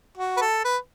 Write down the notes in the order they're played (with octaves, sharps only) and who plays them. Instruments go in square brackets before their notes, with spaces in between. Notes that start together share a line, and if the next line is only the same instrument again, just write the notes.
[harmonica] F#4
B4
A4
B4